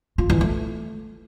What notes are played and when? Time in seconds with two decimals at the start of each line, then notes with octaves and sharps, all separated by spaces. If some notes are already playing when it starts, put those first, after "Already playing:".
0.18 F4
0.30 E3
0.41 A3